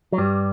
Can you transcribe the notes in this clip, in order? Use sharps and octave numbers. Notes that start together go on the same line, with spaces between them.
F#3
G2 G3